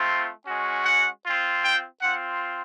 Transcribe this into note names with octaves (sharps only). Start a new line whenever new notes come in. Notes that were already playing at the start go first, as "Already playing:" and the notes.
Already playing: A3 C4 F4
G#3 C#4 F#4
F#5
C4 F4
G5
C4 F4 F#5